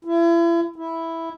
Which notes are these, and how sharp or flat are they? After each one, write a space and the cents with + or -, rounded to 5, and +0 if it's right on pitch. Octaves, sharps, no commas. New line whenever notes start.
E4 +35
E4 -5